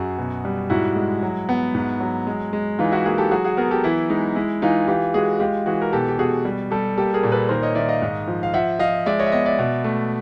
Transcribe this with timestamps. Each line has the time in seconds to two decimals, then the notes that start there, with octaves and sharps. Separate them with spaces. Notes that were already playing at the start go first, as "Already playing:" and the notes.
Already playing: F#2 F#4 G#4
0.18 B2
0.45 G3
0.70 G#2 E4 F#4
0.96 G#3
1.23 F#3
1.49 B3
1.75 G#2
2.00 F#3
2.27 G#3
2.53 G#3
2.79 E3 D#4 F4
2.92 E4 F#4
3.05 A#3 F#4 G#4
3.18 G4 A4
3.31 F#3 F#4 G#4
3.44 F#4 G#4
3.57 B3 G#4 A#4
3.71 G4 A4
3.84 E3 E4
4.10 G#3 D#4
4.35 G#3 E4
4.62 E3 D#4 F4
4.88 E3 F4 G4
5.14 G#3 F#4 G#4
5.40 G#3 F4 G4
5.66 E3 F#4 G#4
5.81 A#4
5.92 B2 G4 A4
6.08 G4
6.19 B2 F#4 G#4
6.45 G3
6.71 G3 G4 A4
6.97 A#3 G4 A4
7.14 G#4 A#4
7.23 A#2
7.32 A4 B4
7.49 D#3 A#4 C5
7.62 C#5 D#5
7.75 D#3 D5 E5
7.88 D#5 F5
8.02 G#2
8.28 F3
8.43 F5
8.54 F3 E5 F#5
8.79 F3 D#5 F5
9.06 G#3 D5 E5
9.19 C#5 D#5
9.26 E5
9.32 B3 C#5 D#5
9.46 D5 E5
9.59 B2
9.84 A3